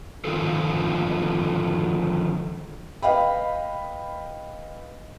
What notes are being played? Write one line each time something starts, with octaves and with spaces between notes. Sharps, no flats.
D3 D#3 F3 F4 G#4 A4
B4 D#5 F5 G5 B5